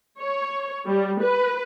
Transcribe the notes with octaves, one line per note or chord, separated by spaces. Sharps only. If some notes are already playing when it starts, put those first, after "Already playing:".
C#5
G3
B4